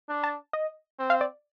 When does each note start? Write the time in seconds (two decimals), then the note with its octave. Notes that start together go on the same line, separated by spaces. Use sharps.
0.09 D4
0.24 A5
0.53 D#5
0.99 C4
1.10 F5
1.21 D5